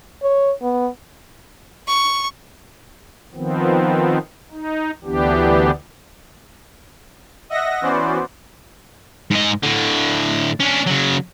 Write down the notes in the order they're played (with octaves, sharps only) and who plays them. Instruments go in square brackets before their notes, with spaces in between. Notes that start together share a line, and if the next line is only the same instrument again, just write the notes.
[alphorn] C#5
B3
[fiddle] C#6
[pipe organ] D#3 F3 B3 C4
D#4
D2 E3 B3 D4 G4
[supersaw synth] D#5 E5 F#5 A#6
E3 B3 C#4 F#4 C5 D5
[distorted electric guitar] G#2 D#5
A2 D3
C#4 D4
C#3 F#3